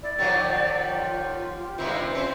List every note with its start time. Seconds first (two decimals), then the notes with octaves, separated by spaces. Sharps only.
0.03 E4 D5
0.19 D#3 F3 F#3 G4
0.93 F4
1.78 G2 C3 D#3 E4 C5
2.14 C4 C#4